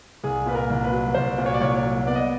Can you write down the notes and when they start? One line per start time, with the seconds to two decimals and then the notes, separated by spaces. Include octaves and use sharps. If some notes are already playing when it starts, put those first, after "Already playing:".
0.24 C2 G#4
0.46 A#2 B4
0.55 A#4
0.70 C2
0.84 B4
0.92 F#3
1.14 C2 C5
1.38 A#2
1.46 C#5
1.54 D5
1.61 C2 C#5
1.76 C#5
1.83 F#3
2.06 B3 D5
2.15 D#5